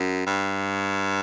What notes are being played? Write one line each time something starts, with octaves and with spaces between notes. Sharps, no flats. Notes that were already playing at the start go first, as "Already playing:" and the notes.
Already playing: F#2
G2